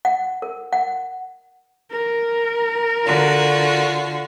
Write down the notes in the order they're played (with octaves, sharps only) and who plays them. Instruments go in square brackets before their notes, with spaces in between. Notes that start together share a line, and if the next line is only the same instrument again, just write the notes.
[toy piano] F#5
A#4
F#5
[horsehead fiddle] A#4
[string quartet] D3 F4 F#4